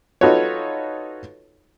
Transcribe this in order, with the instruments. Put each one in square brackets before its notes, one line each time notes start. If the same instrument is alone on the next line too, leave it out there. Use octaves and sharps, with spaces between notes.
[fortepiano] D#4 F4 F#4 A4 B4 C#5